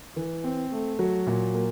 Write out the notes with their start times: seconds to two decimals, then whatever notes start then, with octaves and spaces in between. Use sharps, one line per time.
0.16 E3
0.44 C4
0.71 A3
0.99 F#3
1.27 A#2
1.54 A#3